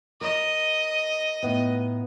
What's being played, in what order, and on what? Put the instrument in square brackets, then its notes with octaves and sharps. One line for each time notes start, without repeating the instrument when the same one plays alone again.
[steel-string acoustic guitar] A#4 [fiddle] D#5
[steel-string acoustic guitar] A2 B3 D#4